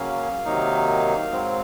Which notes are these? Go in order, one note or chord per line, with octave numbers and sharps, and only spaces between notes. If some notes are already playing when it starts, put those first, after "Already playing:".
Already playing: C#3 F#3 A#3 C#4 F5
C3 D#3 F#3 A#3 D#4
G#2 F#3 C4